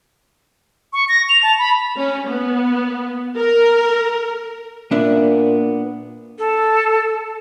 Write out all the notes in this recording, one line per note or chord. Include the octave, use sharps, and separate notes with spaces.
C#6
A#6
F7
A5
B5
C#4
B3
A#4
A#2 B3 D4 E5
A4